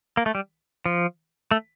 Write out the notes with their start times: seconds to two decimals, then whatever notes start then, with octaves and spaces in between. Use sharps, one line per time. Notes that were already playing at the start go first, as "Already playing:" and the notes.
0.17 A#3
0.26 A3
0.35 G3
0.86 F3
1.51 A3